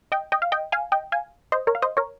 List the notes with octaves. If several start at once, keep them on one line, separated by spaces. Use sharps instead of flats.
D#5 G5
D#5 G5
F5
D#5 G5
F5 G#5
D#5 G5
F5 G#5
C5 D#5
A#4 C#5
F5
C5 D#5
A#4 C#5